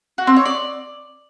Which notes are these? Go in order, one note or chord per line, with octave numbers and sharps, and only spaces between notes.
F#4
C4
C#5
D5